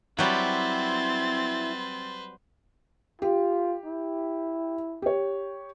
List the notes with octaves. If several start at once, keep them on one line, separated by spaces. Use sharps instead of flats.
F#3 G3 C4 E4 B4 C5 A6
F4 G4
E4
G4 C#5